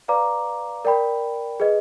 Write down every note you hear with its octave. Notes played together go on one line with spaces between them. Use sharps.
B4 D5 F5 A#5 D6
A#4 D5 G5 B5
G#4 B4 D#5